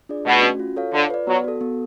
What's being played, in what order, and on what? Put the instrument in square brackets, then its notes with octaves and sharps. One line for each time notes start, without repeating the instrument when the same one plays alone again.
[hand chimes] D4 F4 G#4 D5
[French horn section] B2 [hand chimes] A3
[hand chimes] C#4 F#4
F4
A4 C#5 F5
[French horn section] D3 [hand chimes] F4
[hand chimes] B4 D5
[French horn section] F#3 [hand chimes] B3
[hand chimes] F#4 A4
B3